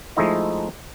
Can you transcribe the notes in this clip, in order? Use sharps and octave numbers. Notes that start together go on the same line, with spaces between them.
F3 G#3 A3 D#4 E4 D#5